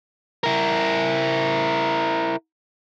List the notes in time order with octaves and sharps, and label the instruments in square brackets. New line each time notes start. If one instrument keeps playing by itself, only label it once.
[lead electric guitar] E4 A#4